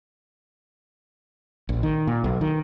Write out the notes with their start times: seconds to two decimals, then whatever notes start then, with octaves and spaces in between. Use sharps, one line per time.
1.69 A#1
1.83 D#3
2.07 A#2
2.24 B1
2.41 D#3